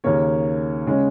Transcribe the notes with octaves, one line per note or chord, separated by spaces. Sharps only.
D#2 C#3 A#3 C#4 C#5
C#3 G#3 C#4